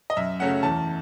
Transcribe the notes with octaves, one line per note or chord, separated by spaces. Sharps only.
D#5
F#2 E5
C#3 F#3 A3 C#4 F#5
E2 A5